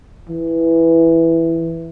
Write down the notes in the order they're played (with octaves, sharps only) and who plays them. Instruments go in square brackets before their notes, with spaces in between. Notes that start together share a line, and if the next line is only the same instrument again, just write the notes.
[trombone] E3